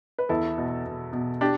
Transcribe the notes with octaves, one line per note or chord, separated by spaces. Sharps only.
B4
E2 E4 A4
B2
B2
B2
D4 G4